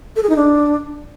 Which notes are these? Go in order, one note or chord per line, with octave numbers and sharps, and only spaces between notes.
A4
G#4
D#4
D4